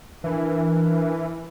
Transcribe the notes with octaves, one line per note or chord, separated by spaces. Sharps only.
E3 D4 A#4 B4